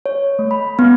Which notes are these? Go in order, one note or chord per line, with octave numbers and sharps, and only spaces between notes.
C#5
A3
B5
B3